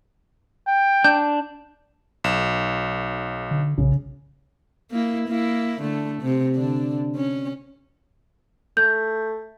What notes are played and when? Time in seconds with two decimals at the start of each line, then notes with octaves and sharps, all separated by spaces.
0.67 G5
1.04 D4 G6
2.24 B1 E7
3.51 D3
3.78 B1 C#3
4.92 A#3 E4
5.28 A#3 E4
5.81 D3 A3
6.22 C3
6.55 D3 D4
7.16 C#4
8.77 A3 G6